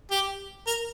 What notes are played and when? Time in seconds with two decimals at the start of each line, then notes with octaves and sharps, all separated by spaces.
0.11 G4
0.67 A#4